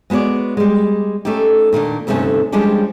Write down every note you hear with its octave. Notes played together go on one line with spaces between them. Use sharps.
G#3 B3 F#4 C#5 D5
G3 G#3
A3 C#4 D#4 G4
A#2 D#3 A#3 D4
D2 G2 C3 D#3 A3 C#4
F3 G3 G#3 C#4 D4 G4